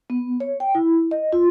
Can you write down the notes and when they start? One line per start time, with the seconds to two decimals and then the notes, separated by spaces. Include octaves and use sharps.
0.10 B3
0.40 C#5
0.60 G5
0.75 E4
1.11 D#5
1.33 F4